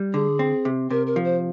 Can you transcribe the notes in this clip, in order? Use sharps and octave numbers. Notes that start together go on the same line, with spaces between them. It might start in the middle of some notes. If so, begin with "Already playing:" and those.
Already playing: G3
D3 G#4
C4
C3
C3 A#4
A#4
F3
C5